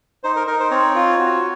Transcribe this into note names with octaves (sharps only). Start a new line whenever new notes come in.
D#4 C5
A#4
D#4 A#4
C5
C4 C#5
F4
F#4